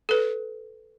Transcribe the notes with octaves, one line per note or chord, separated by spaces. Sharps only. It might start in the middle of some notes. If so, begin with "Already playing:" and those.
A4 B4